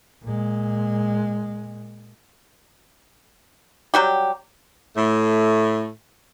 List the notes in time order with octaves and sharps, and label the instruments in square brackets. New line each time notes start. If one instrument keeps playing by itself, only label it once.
[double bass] A#2 G#3
[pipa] F#3 G3 F#4 G4
[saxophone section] A2 A3